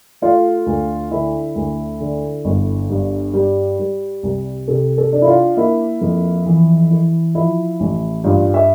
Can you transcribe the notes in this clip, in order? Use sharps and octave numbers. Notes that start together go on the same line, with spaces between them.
A3 F4
D2
D3 E4
D2
D3
G1
G2
G3
G3
C2
C3 A4
A4
D4
E4
F4
A#3 E4
F2
E3
E4
F3 E4
A1
G2 F4
E5